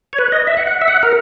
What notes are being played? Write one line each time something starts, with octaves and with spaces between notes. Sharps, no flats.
C#5
B4
D#5
E5
F#5
F#5
E5
F#5
A#4